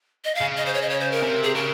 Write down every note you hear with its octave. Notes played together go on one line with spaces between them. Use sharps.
D#5
F5
C#3
D#5
C5
C#5
D#5
C#5
C5
A#4
C3
G#4
C#3 A#4